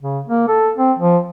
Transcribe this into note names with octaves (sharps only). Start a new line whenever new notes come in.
C#3
A#3
A4
C4
F3